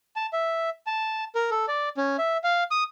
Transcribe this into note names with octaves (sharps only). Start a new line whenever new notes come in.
A5
E5
A5
A#4
A4
D5
C#4
E5
F5
D#6